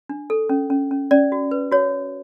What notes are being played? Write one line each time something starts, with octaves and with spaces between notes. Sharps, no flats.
D4
A4
C#4
C#4
C#4
C#4 D5
F#4
B4
F#4 C#5